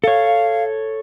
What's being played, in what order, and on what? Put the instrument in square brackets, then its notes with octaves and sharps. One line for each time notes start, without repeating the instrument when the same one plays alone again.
[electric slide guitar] A4 C#5 [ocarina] F5